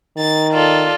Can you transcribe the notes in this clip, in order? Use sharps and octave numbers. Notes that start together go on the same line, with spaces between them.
D#3 A6
F4 A4 D5